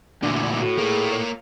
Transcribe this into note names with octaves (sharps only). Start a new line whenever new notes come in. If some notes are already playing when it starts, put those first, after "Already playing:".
D2 A#2 D3 E3 D4
D5
A2 F#4
A#3 F4 G#4
C#5